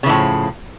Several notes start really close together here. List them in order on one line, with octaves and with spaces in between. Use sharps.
C#3 E3 A2 F3